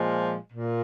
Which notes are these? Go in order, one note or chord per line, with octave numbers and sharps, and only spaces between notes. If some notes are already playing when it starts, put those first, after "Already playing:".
Already playing: A#2 F3 G#3
A#2